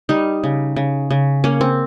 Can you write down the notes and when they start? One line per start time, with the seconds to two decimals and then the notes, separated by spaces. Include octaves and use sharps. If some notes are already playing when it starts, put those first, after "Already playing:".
0.09 G3 D#4
0.44 C#3
0.76 C#3
1.11 C#3
1.44 A#3 C#4
1.61 C4